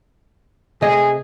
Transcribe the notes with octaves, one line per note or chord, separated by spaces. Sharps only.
C3 A3 G#4 D#5